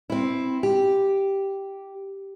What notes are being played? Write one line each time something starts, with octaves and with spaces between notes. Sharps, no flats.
C4 E4
G4